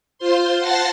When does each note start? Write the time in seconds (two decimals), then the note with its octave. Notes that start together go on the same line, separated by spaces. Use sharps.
0.18 F4 C5 C6
0.59 F#5 A5 A6 A#6 C7